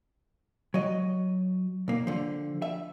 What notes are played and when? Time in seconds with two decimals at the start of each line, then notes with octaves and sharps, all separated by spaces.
0.74 F#3 D#5
1.88 B1 A#3
2.07 D3 F3
2.62 E5